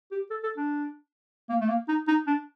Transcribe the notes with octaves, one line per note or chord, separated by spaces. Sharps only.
G4
A4
A4
D4
A#3
A3
A#3
D#4
D#4
D4